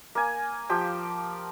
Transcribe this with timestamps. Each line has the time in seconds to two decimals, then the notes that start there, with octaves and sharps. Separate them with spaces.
0.15 A#3 G#5
0.69 F3 G4 G5